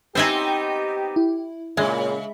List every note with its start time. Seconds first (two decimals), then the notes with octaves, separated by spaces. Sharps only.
0.15 B3 C4 D#4 G4 C5 E5 G#5
1.16 E4
1.77 A#2 C#3 G#3 E5